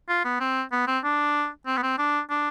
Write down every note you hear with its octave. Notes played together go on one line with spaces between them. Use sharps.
F4
B3
C4
B3
C4
D4
C4
B3
C4
D4
D4